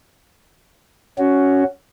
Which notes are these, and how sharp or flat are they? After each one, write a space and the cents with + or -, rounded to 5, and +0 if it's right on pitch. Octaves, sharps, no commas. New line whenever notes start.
C#4 +10 F#4 +5